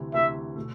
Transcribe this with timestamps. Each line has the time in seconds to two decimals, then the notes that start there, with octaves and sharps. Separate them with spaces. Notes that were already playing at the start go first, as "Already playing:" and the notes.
Already playing: D2 C3 E3
0.14 D2 C3 E3 E5
0.56 B2 A3